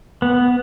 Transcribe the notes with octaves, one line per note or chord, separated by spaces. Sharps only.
B3